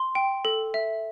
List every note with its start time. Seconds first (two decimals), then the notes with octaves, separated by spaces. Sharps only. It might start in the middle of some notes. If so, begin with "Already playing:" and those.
Already playing: C6
0.15 G5
0.45 A4
0.74 E5